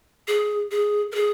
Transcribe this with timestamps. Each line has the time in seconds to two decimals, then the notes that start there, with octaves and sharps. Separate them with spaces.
0.28 G#4
0.71 G#4
1.12 A#4
1.15 G#4